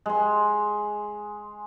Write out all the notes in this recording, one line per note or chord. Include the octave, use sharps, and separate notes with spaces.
G#3 C6